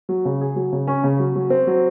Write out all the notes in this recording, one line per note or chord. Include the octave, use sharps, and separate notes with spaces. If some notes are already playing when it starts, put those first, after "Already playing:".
F#3
C#3
G#4
F#3
C#3
C#4
C#3
F#3
F#3
C4
F#3